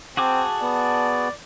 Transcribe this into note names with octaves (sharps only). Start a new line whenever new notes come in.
C4 F#4 G#4 A5 D6
B3 D5